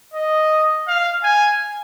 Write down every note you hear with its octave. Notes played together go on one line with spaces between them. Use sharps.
D#5
F5
G#5